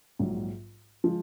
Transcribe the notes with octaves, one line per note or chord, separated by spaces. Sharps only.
A#1 G#2 F#3
F3 G#3